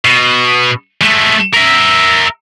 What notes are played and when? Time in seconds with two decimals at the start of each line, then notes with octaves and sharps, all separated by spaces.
0.05 B2
1.01 G#3 A3
1.54 A#4 E5